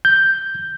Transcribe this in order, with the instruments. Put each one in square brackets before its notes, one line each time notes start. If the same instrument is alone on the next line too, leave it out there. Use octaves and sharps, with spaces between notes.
[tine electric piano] G6